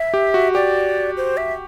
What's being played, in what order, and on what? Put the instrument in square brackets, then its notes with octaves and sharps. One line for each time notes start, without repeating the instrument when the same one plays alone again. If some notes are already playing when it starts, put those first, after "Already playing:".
Already playing: [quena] E5
[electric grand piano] G4
F#4
[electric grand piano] G4 [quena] D5
[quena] C5
E5